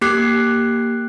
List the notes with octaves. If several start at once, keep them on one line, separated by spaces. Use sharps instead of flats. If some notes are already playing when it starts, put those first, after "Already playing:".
A#3 G4 D6 F#6 C7